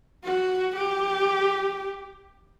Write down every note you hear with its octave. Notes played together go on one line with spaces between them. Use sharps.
F#4
G4